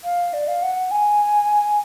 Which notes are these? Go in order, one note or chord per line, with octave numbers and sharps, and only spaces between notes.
F5
D5
F5
F#5
G#5